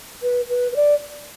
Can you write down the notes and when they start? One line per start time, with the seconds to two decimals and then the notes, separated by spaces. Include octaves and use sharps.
0.23 B4
0.50 B4
0.72 B4
0.76 D5